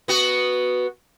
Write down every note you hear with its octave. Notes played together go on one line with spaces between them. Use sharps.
B3 F#4